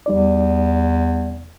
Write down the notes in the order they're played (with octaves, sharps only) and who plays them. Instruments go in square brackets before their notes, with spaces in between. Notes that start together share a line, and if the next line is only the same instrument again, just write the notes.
[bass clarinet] E2 [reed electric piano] G3 D#4 D5